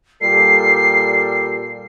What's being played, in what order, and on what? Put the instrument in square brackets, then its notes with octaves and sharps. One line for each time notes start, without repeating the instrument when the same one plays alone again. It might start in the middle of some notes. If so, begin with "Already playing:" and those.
[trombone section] A#2 G3 A4 [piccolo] C7